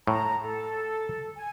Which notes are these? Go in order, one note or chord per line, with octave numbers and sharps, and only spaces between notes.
A2 A5 A#5
A4
G#5